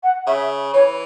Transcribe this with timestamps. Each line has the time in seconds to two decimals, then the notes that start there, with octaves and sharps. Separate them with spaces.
0.03 F#5
0.27 C#3 E5
0.73 E3 C#5